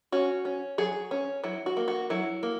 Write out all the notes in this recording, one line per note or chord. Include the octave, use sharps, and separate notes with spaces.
C#4 F#4
C#4
F#3 G#4
C#4
F#3 E4
F#4
A#3
F#4
F#3 E4
A#3